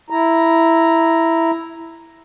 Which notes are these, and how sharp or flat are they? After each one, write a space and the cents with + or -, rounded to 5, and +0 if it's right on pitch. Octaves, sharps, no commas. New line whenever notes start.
E4 +0 A#5 +0